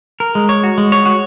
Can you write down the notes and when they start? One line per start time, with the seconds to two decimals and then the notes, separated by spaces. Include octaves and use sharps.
0.20 A#4
0.35 G#3
0.49 C#5
0.64 F#4
0.78 G#3
0.92 C#5
1.06 F#4